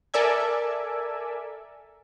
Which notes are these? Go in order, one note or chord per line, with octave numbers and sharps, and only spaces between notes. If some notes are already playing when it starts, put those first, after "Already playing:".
A4 A#4 D5 E5 G#5